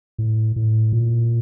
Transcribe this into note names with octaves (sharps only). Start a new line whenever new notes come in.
A2
A2
A#2